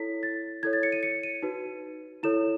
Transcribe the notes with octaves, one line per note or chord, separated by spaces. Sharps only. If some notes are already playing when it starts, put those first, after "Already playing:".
Already playing: E4 A4 C#5 B6
A6
E4 A4 C#5 G#6
A6
C#7
D#7
C#7
D#7
D#4 F#4 B4
E4 A4 C#5 E7